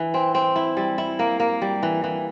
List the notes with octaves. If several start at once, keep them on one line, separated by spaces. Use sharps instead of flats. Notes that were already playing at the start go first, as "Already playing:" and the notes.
Already playing: E3
C4
C4
E4
G3
E4
A#3
A#3
G3
E3
E3